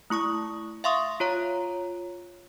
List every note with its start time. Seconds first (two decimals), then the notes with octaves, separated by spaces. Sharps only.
0.10 A3 E4 C#6 D#6
0.84 E5 F5 C6 C#6 D#6
1.20 F4 C#5 A#5